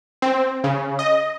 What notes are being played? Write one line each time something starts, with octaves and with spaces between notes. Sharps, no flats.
C4
C#3
D#5